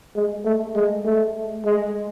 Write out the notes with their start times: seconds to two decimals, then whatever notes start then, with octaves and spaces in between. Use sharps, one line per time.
0.16 G#3
0.45 A3
0.76 G#3
1.05 A3
1.65 G#3